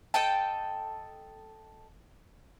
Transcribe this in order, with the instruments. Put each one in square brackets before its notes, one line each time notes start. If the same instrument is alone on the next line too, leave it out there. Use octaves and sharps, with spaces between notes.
[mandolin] A4 D#5 G5 A5